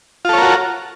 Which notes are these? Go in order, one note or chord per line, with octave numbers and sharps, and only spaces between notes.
F4 F#4 A4 A#4 C#5